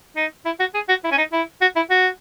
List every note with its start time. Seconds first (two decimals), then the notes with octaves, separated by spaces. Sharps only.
0.16 D#4
0.45 E4
0.60 F#4
0.74 G#4
0.89 F#4
1.04 E4
1.12 C#4
1.18 D#4
1.33 E4
1.61 F#4
1.76 E4
1.90 F#4